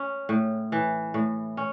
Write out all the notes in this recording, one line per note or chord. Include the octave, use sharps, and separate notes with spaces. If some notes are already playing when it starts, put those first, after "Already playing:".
Already playing: C#4
A2
E3
A2
C#4